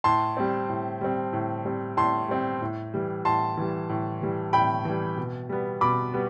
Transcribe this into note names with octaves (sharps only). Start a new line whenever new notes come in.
A2 A5 C6
G3 C4
A2
G3 C4
A2
G3 C4
A2 A5 C6
G3 C4
A2
E3 G3
A2 A5 C6
E3 G3
A2
E3 G3
A2 G5 B5
E3 G3
B2
G3 B3
B2 B5 D6
G3 B3